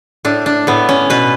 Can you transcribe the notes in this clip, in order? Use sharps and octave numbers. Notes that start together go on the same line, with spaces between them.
A2 D4
D4
A2 B3
C#4
B2 B4